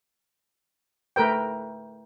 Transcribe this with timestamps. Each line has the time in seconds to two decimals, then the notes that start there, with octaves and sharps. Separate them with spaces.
1.16 A3 A#4 B4 G5